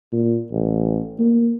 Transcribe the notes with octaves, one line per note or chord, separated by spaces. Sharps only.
A#2
A1
A#3